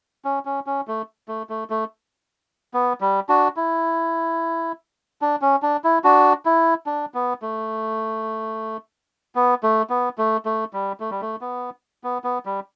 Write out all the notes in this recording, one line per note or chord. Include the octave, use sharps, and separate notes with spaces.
C#4
C#4
C#4
A3
A3
A3
A3
B3
G3
D4 F#4
E4
D4
C#4
D4
E4
D4 F#4
E4
D4
B3
A3
B3
A3
B3
A3
A3
G3
A3
G3
A3
B3
B3
B3
G3